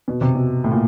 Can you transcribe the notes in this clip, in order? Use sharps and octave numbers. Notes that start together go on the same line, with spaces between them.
B2
C3
B2
A2
A#2